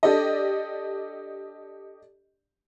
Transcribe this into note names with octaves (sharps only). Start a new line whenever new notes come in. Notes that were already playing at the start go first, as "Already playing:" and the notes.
D4 G4 A4 D5 D#5